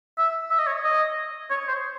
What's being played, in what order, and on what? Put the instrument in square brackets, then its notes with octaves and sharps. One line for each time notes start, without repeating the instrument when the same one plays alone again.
[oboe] E5
E5
D#5
C#5
D#5
C#5
C5